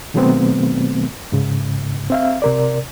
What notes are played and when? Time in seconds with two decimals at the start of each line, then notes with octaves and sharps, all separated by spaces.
0.14 B2 D#3 F#3 A3 B3 C4
1.32 G#2 C#3
2.10 C4 E5 F5
2.42 C3 A#4 D5